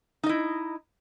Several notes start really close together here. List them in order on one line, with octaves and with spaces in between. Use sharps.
D#4 D#5 E4